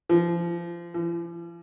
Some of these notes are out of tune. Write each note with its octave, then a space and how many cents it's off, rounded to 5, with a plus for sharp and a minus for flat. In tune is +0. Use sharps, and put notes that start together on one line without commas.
F3 -25
F3 -45